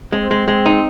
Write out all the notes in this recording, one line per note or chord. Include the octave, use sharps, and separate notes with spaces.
G#3 C4
G#3
G#3
D#4